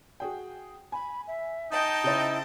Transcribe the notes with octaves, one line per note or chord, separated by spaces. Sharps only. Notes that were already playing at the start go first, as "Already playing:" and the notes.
F#4 G#4 G5
G#5 B5
E5
D#4 D#5 G5 A5
C#3 E4 C5